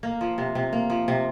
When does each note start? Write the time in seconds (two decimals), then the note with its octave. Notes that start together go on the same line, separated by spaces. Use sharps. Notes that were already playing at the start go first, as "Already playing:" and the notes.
0.03 A#3
0.21 F3
0.38 C3
0.55 C3
0.73 A#3
0.90 F3
1.08 C3